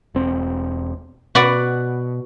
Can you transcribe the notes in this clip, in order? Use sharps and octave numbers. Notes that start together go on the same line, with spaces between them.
E1 C4
B2 F#4 B4 D5